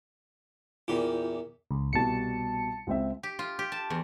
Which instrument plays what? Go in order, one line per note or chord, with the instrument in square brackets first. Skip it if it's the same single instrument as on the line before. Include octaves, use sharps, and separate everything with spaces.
[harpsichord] E2 A#2 G4 [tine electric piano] E4 F4
[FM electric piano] C#2
[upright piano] C2 B2 G3 [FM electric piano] A5 C#7
[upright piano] C#2 C4 E5
[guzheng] G4
F4
G4
A5
E2